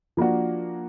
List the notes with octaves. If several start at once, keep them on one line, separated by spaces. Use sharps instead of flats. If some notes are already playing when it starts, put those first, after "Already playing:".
F3 A#3 D4 F#4